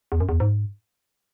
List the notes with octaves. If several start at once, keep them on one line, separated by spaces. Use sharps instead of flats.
E2
F#2
E2
G#2